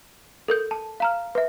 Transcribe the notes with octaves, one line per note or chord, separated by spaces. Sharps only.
A4 A#4 G6
A5
F5 A#5 F6
B4 E5